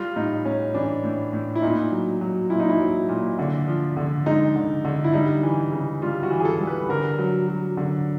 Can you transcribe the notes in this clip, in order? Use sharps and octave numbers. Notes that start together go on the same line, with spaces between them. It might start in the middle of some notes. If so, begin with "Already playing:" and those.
Already playing: G3 F4
A2 D#4
A2 C#4
E3 D4
A2
A2
E4
A#2 D#4
F#3
F#3
A#2 E4
D#4
E4
F#3
A#2
D3
F3
D3
G#3 D#4
D3
D3
E4
G3 D#4
E3
C#3
G3 F4
F#4
E3
G#4
A4
G3
B4
D3 A#4
F#3
F#3
D3